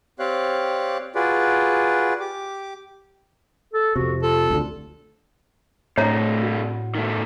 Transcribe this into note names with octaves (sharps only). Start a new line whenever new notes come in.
C4 G4 C#5 D5 F5 F#6
F4 F#4 G#4 B4 D5
G4 D6
A4
F2 C3 F#4
F4 A4
D2 G2 D3
A2 C3 A3 D4 C#5 A#5 A#6 C7
F#4
D#3 A3